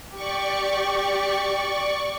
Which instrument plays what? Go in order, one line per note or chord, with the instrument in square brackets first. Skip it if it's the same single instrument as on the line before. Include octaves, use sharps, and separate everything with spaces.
[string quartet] G4 [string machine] D5 C#6